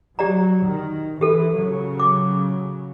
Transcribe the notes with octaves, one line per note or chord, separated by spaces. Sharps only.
F#3 G4 D5 A#5
D#3
E3 G4 A4
C#3 F#3
D6